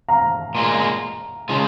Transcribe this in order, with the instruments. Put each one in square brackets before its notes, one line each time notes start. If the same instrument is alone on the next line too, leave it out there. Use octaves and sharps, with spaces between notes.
[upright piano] F5 A#5
[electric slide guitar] A#2 G#3 F4
C#3 G#3 F4